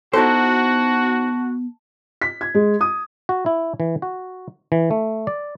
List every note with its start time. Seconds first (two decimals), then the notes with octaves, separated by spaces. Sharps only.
0.13 B3 D#4 E4 F#4 A4 C5
2.22 B6
2.41 G#6
2.54 G#3
2.81 D#6
3.29 F#4
3.46 E4
3.80 E3
4.02 F#4
4.72 E3
4.91 A3
5.27 D5